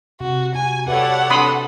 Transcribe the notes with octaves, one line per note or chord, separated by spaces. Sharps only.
C3 F#4
F#4 G#5
G4 A4 B4 C#5 D5 E5 F#5
C4 D4 A4 B5 C6 D#6